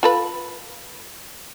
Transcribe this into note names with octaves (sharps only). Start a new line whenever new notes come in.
F4 A4 B4